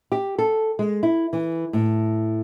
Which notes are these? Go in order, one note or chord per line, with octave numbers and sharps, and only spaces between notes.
G4
A4
G#3
E4
E3
A2